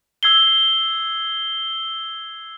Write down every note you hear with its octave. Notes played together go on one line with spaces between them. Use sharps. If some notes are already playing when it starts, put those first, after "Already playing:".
E6 G#6 C7 G7